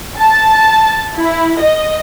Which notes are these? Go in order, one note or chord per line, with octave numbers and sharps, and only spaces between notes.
A5
E4
D#5